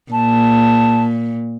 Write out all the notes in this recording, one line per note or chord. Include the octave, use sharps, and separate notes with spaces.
A#2 A5